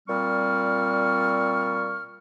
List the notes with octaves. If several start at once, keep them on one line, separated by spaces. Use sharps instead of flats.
A#2 G3 C4 C#6 F6